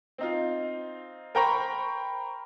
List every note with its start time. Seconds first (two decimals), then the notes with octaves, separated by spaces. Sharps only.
0.18 C4 D#4 F4
1.35 A#4 C5 G5 A#5 B5 C#6